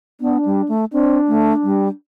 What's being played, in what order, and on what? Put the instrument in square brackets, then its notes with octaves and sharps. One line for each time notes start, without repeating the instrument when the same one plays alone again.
[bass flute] B3 [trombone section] D4
[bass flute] G3
A3
[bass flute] C4 [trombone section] D4
[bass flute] A3
G3